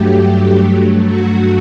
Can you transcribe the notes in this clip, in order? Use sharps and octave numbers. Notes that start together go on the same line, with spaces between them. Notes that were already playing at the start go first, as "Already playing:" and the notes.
Already playing: G2 F#3 A3 G4
G2 F#3 A3
F#4